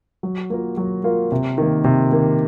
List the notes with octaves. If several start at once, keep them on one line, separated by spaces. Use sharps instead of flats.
F#3
A#3 F4 A#4
F#3
A#3 F4 A#4
C3
D#3 A#3
C3
D#3 A#3